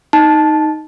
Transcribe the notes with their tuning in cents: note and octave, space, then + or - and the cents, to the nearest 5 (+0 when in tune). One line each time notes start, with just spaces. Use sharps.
D#4 +0 A5 -10